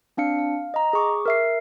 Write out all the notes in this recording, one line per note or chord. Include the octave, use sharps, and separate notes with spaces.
C4 D4 F5 C#7
F5
D#5 A#5
G#4 C#6 D6
A#4 E5 C7